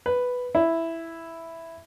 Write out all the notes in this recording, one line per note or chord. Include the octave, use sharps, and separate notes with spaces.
B4
E4